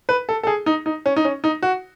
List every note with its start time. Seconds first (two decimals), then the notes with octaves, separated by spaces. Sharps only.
0.09 B4
0.29 A4
0.43 A4
0.47 G#4
0.66 D#4
0.86 D#4
1.06 C#4
1.16 D#4
1.25 C#4
1.44 D#4
1.62 F#4